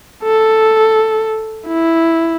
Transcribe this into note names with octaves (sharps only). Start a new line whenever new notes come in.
A4
E4